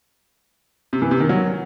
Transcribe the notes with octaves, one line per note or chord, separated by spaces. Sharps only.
C3
E3
C3
D#3
F#3